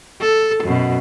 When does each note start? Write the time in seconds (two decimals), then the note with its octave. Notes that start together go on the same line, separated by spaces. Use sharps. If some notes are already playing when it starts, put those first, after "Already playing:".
0.21 A4
0.63 F#2 B2